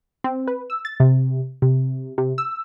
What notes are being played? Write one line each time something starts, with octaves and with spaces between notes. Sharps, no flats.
C4
B4
E6
A6
C3
C3
C3
E6